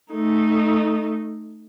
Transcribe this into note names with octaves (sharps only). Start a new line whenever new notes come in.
A3 D#4